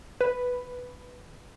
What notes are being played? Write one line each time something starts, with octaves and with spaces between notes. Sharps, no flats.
B4